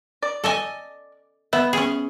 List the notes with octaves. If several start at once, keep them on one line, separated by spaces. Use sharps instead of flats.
D5
A4 D#5 G#5
B3 E5
C#4 G#4